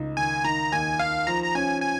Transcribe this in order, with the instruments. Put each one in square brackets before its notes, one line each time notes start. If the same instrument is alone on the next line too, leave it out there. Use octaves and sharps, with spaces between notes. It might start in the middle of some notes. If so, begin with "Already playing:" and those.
Already playing: [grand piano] C#2 D#4
[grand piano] D#3 [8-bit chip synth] G#5
[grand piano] D#3 [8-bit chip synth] A#5
[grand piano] D#2 [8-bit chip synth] G#5
[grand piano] D#3 [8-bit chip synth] F5
[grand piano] F3 [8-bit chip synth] A#5
[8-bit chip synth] A#5
[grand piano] C#4 [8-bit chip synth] G#5
[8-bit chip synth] G#5